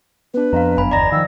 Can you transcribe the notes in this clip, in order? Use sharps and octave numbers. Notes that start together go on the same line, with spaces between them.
B3 D4 B4
F2 F5 A#5
G1 F#2 G#5 B5
G1 E2 D5 D#5 A#5 A#6
D#3 F3 F5 E6